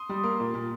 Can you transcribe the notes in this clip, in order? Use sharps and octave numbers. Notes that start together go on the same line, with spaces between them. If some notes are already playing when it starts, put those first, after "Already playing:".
Already playing: C6 D#6
G3
A#3
A#2
A#2